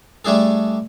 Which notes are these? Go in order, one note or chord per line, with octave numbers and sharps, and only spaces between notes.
G3 A3 D4 G#4 A4